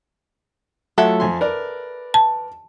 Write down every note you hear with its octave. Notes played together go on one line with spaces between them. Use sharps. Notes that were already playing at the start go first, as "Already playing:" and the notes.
F#3 A3 F4 A4 E5 F#5
F2 G#5 C6
A#4 B4 D5
A5